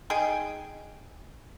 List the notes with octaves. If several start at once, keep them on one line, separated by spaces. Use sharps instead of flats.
D#4 G#4 G5 G#5